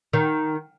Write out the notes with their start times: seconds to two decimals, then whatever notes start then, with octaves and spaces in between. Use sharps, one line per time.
0.13 D#3